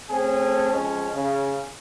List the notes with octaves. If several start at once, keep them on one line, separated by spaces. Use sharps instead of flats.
A3 C4 C#4 G#4 A4
F2 G#3 C#4
C#3